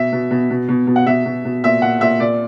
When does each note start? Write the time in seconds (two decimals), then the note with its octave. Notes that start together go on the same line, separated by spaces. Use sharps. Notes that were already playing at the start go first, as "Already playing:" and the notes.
Already playing: B2 E5
0.13 B2
0.31 B2
0.50 B2
0.69 B2
0.87 B2
0.96 F#5
1.06 B2 E5
1.26 B2
1.45 B2
1.64 A#2 E5
1.82 A#2 F#5
2.01 A#2 E5
2.20 A#2 D5